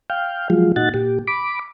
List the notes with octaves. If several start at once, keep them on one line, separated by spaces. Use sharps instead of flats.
F5 G5
F3 F#3 G#3 F4
A#2 D#4 F#4 F#5 A6
A#2 G4
B5 D6